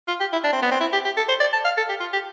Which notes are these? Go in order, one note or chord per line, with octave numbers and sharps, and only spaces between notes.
F4
G4
E4
D4
C4
B3
C4
E4
G4
G4
A4
C5
D5
A5
F5
A4
G4
F4
G4